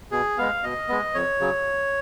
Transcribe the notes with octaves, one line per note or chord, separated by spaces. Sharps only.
B2 G#4
G#3 B3 F5
B2 D#5
G#3 B3
F2 C#5
C#3 F#3